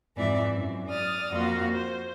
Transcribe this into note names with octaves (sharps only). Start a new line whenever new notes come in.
F2 G#2 E3 C4 D5 E5
F#2
D5 D#6 F6 A6
F2 A#3 F#4 F5 C6
C5